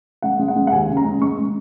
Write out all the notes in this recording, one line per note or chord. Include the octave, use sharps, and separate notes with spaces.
G#3 F#5
G#3
F#5
G#3
F#5
D#2 G#5
C#3
A#5
G#3
G#3 C#6
G#3